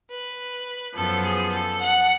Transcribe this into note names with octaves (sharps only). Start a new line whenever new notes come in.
B4
F#2 F3 B3 A4
G#4
A4
F#5